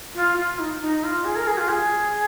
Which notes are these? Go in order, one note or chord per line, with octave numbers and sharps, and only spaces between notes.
F4
F4
D#4
D#4
F4
G#4
A#4
G#4
F4
G#4